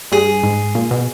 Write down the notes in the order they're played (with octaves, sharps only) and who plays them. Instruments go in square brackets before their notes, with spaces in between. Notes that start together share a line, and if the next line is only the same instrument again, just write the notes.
[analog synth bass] G2 [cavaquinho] G#4
[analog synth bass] G#2
A#2
B2